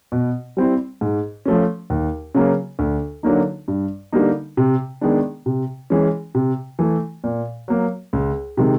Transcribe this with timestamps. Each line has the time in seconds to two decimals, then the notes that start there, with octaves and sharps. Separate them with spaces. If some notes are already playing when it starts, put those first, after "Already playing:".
0.12 B2
0.57 G3 C4 E4
1.01 G#2
1.46 F3 A3 C#4
1.90 D#2
2.35 C#3 F#3 A#3
2.79 D2
3.23 D3 F#3 A#3 D#4
3.68 G2
4.12 D3 G3 A#3 D#4
4.57 C3
5.01 D#3 G#3 B3 D4
5.46 C3
5.90 E3 G#3 C#4
6.35 C3
6.79 E3 A3
7.24 A#2
7.68 F#3 A#3
8.13 C#2
8.57 C3 D#3 G#3